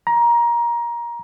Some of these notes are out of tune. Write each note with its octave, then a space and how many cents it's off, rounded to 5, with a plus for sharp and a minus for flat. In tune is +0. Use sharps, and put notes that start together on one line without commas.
A#5 +20